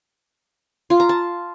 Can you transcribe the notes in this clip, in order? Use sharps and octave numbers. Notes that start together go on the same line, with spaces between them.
F4
A#5
A5